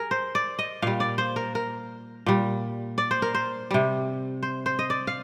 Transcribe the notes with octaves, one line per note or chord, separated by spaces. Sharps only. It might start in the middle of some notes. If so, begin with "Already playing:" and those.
Already playing: G#4 A#4
C5
D5
D#5
A#2 G3 F5
D5
C5
A#4
A#4
A#2 G3
D5
C5
A#4
C5
C3 G3
C5
C5
D#5
D5
F5